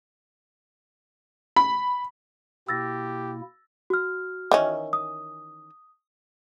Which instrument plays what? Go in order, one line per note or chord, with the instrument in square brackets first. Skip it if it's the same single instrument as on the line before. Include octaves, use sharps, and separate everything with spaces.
[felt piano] B5
[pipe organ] B2 A#3 E4 [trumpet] G4 [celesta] E6 A6 A#6
[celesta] F#4 F6
[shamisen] D#3 E3 C#4
[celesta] D#6